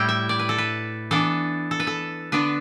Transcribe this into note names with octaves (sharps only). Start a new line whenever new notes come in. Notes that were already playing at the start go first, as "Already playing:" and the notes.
Already playing: A2 G3 E4 G5
E5
D5
B4
A4
B4
E3 B3 D4 A4
A4
B4
A4
D3 B3 D4 B4